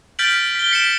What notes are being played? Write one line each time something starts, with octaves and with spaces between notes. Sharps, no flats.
F6 G6 A6 B6 D7 F#7
B6 G7
B6 C#7 D7 E7